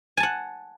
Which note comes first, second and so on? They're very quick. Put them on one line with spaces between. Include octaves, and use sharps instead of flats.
G#5 A5 F#5